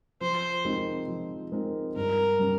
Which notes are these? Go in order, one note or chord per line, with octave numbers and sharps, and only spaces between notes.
F3 C5
G#3 C4 D#4 A#4
F3
G#3 C4 D#4 A#4
G2 A#4
G3 C#4